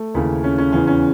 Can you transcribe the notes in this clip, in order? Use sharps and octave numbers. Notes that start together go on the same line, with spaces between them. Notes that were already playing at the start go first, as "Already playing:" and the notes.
Already playing: A3
D#2 C#3 E3
C#4
C#4
E2 C#3 E3 C#4
C#4